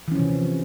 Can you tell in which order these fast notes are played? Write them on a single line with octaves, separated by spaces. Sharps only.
E3 C#4 F3 C3